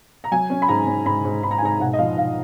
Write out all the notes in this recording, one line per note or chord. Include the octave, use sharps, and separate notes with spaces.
A#5
F#3 G#5
C#4
B5
G#2 A#5
C#4
G#2 B5
G#2
G#2 B5
A#5
G#5
G#2 A#5
B1 F#5
D#5
F3 F5
B1 F5